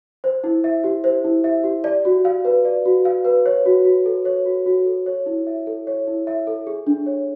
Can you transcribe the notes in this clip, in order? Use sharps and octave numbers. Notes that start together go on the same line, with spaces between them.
C5
E4
E5
G4
C5
E4
E5
G4
D5
F#4
F5
B4
D5
F#4
F5
B4
C#5
F#4
F#4
A4
C#5
F#4
F#4
A4
C#5
E4
E5
A4
C#5
E4
E5
A4
G#4
D4
C#5